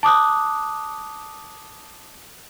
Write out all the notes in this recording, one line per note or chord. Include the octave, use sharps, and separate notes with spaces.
A5 D6 D#6 F#6